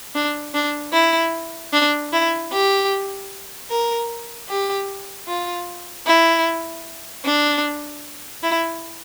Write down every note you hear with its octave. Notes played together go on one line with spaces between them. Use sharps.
D4
D4
E4
D4
E4
G4
A#4
G4
F4
E4
D4
E4